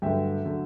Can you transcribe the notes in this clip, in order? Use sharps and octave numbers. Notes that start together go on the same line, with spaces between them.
G2 D3 F#3 A3 E5 G5
D3 F#3 A3